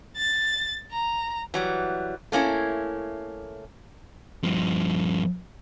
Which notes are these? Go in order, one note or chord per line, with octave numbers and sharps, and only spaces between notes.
A6
A#5
E3 F#3 G3
A3 A#3 C#4 E4
G2 F3